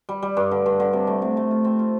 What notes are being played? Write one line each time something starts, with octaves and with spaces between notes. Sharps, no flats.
G3
G3
G2
D3
G2
D3
C3
A3
C3
A3
F4
C4
F4